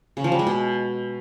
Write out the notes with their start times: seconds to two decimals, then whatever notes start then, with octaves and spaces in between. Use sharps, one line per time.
0.17 C#3
0.24 F3
0.32 G3
0.39 G#3
0.47 B2